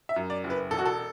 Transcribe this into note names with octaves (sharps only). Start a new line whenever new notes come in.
E5
F#2
D5
F#1
B4
E1 A4
F#4
A4